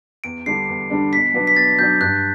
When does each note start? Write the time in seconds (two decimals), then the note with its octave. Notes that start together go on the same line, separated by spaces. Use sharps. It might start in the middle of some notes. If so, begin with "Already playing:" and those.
0.24 E2 D7
0.46 D3 G3 D4 C7
0.69 E2
0.90 D3 G3 D4
1.13 B2 B6
1.34 F#3 B3 D4
1.47 B6
1.56 B2 A6
1.79 F#3 B3 D4 G6
2.01 G2 F#6